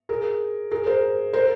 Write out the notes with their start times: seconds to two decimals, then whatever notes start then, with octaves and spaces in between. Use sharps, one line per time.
0.09 G#4 A#4
0.71 G#4 A#4
0.86 A#4 C5
1.33 A#4 C5